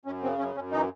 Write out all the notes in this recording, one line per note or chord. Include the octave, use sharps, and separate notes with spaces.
F#2 C#4
C#3 C4
F#2 C#4
F#2 C#4
E3 D#4